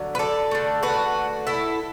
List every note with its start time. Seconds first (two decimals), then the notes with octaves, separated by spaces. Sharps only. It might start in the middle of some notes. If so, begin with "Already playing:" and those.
Already playing: D3 F#3
0.15 B4
0.19 A4 D5
0.51 D3 A3
0.83 F#4 B4
1.47 E4 A4